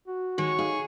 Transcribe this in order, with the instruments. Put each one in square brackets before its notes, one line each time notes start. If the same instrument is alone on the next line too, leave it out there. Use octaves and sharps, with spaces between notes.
[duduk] F#4
[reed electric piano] D#3 [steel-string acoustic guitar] G#3 [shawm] C#5
[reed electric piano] D#4 F5 [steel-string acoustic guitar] G#4